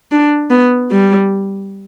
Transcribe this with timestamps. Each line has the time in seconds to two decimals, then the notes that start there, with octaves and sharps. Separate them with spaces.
0.12 D4
0.50 B3
0.91 G3